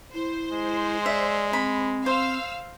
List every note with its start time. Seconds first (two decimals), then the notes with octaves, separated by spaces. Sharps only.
0.14 E4 C5
0.52 G#3
1.06 D5 E5
1.53 C4 B5
2.06 C5 F5 E6